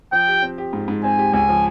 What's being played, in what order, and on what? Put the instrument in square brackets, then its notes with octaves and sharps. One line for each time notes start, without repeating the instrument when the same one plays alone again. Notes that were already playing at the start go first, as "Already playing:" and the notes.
[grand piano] F3 [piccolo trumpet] G5
[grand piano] G4
C4
G4
G#2
G#2
[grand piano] C4 [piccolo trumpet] G#5
[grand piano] G4
[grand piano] C#2 [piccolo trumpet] G#5
[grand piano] F3